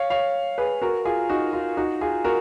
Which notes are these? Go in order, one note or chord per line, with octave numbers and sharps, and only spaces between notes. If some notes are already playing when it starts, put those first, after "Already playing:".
Already playing: C#5 F5
C#5 F5
G#4 B4
F#4 A#4
F4 G#4
D#4 F#4
F4
D#4 F#4
F4 G#4
F#4 A#4